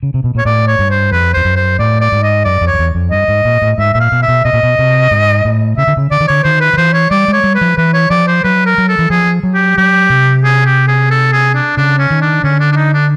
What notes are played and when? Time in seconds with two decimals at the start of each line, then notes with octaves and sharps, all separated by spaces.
0.03 C#3
0.14 C3
0.24 B2
0.35 A#2 C#5
0.45 A2 D5
0.68 C#5
0.79 G2
0.90 C5
1.11 F2 B4
1.34 F2 C5
1.45 F#2
1.56 C5
1.79 A2 D5
2.01 D5
2.12 G#2
2.23 D#5
2.45 F#2 D5
2.61 F2
2.67 C#5
2.74 F2
2.79 E2
2.95 F2
3.11 G2 D#5
3.28 G#2
3.45 A#2
3.62 A2
3.78 G#2 E5
3.94 A#2 E5
4.00 F5
4.12 B2
4.22 E5
4.28 B2
4.45 B2 D#5
4.53 A#2
4.63 B2
4.79 C3
5.11 G#2
5.45 A2
5.77 C#3 E5
5.87 D3
5.97 C#3
6.11 D3 D5
6.20 D#3
6.28 D3 C#5
6.44 D#3 C5
6.61 B4
6.73 D#3
6.77 E3 C5
6.94 C#5
7.11 G3 D5
7.28 G#3 C#5
7.44 G3
7.55 B4
7.61 F3
7.77 E3 B4
7.94 C#5
8.10 F3 D5
8.27 C5
8.44 F#3 B4
8.66 A#4
8.78 F#3
8.89 A4
8.99 E3
9.10 F3 G#4
9.43 F#3
9.54 G4
9.77 F#3 G4
10.10 C3
10.44 G#4
10.66 G4
10.88 G#4
11.11 A4
11.33 G#4
11.55 D4
11.77 C#3 D4
11.99 C#4
12.10 D#3
12.21 D4
12.44 D3 C#4
12.60 D4
12.72 D4
12.76 D#4
12.93 D4